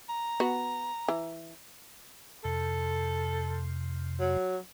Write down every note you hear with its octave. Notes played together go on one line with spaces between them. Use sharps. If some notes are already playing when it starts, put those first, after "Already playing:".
A#5
B3 F#4
E3
F2 C3 A4
F#3